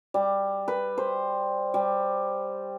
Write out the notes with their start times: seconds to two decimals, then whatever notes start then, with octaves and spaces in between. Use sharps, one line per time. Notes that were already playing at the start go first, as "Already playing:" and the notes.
0.14 G3
0.68 B4
0.98 C5
1.74 G3